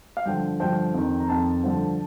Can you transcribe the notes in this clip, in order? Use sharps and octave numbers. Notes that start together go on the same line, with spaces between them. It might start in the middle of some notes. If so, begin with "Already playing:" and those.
F5
G2 D3 F3 G5
G2 D3 F3 G5
F2 D#3
A#5
F2 D#3 A5
G2 D3 F3